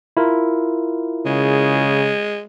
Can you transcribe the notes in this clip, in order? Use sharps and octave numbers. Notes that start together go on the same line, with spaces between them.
E4 F4 A#4
C#3 G#3